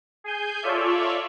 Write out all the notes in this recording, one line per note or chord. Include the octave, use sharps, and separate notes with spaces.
G#4 G#5 G6
F4 A4 C#5 D5 E5